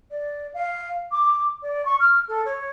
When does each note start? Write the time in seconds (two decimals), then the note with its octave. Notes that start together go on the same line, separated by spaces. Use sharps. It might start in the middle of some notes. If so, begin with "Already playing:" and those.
0.10 D5
0.54 F5
1.12 D6
1.62 D5
1.85 C#6
2.00 F6
2.28 A4
2.45 C#5